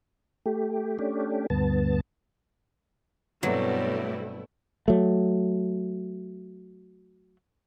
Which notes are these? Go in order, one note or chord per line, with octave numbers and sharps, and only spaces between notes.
A3 G4
A3 C#4 D4 G4
D2 G2 B3 A5
G2 B2 F#3 A3 B3 C4 E4 C6
F#3 A3